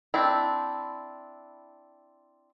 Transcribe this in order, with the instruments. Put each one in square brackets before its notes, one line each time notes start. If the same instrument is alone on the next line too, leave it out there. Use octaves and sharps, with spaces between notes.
[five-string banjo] C4 D4 E4